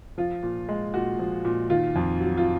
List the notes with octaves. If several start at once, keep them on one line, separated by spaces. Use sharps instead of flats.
F3 F4
A#2
G#3
A#2 F#4
F3
A#2
D#3 F4
F2
F#3
F4